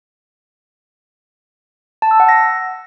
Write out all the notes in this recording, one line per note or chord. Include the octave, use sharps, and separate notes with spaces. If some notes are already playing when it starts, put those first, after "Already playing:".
A5
E6
F#5
A#6